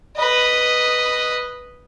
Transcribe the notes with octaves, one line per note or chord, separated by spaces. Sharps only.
B4 D#5